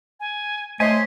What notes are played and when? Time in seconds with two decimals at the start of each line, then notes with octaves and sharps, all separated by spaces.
0.20 G#5
0.80 A3 C5 C#5 D#5 G#5 C6 B6